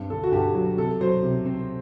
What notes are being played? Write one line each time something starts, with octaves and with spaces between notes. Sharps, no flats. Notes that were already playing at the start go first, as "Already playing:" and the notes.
Already playing: G2 C4
D3 A4
F#4
G2 G4
F#3
C3 A4
F#3 C5
C3
C4